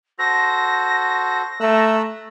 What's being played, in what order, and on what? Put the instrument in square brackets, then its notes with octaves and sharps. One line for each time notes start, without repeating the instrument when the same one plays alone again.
[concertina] F#4 A4 C5 [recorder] A#6
[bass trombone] A3 [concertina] A#5 E6 F#6